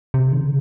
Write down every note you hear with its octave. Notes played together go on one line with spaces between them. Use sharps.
C3
D#3
C#3